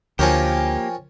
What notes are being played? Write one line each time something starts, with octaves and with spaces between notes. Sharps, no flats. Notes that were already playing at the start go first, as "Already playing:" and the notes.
D2 F3 A#3 C#4 G4 A#4 G5 G#5